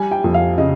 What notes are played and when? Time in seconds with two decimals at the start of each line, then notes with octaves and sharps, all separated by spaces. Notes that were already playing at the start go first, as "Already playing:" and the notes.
Already playing: G3 G#5
0.11 G5
0.24 F2
0.34 F5
0.58 C#3 D#5